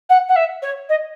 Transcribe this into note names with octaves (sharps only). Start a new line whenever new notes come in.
F#5
F#5
E5
C#5
D#5